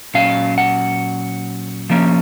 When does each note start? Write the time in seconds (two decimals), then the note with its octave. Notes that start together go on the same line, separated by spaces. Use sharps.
0.14 A#2 F#3 C#4 F5
0.58 F#5
1.90 F3 A#3 C#4